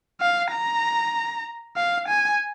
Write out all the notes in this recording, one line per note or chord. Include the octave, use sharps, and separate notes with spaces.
F5
A#5
F5
G#5